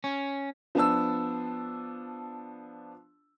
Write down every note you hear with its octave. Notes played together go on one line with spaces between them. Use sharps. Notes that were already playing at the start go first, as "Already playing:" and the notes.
C#4
F3 B3 D4 A5 E6